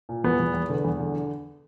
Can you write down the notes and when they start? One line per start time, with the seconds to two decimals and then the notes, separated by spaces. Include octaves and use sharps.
0.09 A#2
0.24 E2 B3
0.40 E2
0.54 E2
0.69 D3
0.84 E2
1.00 D3